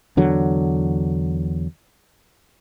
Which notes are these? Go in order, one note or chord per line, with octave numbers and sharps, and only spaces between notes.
E2 D3 F#3